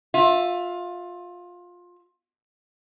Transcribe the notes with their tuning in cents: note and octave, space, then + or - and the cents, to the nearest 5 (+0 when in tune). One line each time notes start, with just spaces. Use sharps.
F4 +20 E5 +0